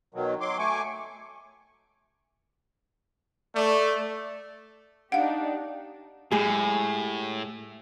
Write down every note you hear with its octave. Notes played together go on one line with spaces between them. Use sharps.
B2 D#3 F#3
F#3 C6 D6
A3 G#5 C#6 D6
A3 D5
D4 D#4 G4 F5 F#5
A2 G#3 G4 G#4